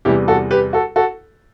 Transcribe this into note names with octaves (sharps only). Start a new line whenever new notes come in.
E2 C3 E3 G3 E4 G4
F#4 A4
G4 B4
F#4 A4
F#4 A4